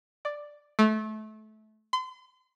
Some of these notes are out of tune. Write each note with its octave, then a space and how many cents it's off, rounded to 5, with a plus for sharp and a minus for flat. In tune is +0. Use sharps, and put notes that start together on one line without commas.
D5 +5
A3 -25
C6 -35